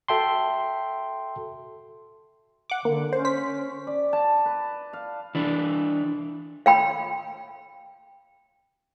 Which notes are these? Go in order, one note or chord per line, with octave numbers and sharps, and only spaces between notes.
F#4 A4 E5 G5 A5 C6
F#5 D6
D3 A#3
C#4 C5
C5 B6
D5
A5
B4
F5
E3 D4
F5 G5 B5